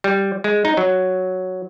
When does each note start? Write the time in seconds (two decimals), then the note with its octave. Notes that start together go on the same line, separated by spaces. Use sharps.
0.04 G3
0.44 G#3
0.65 D#4
0.77 F#3